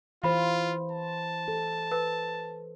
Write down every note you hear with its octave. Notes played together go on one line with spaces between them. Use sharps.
E3 F4 C5 F5 B5
A5
A4
B4